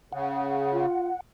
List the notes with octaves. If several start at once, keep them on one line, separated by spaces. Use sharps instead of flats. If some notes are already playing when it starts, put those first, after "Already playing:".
C#3 F#5
F4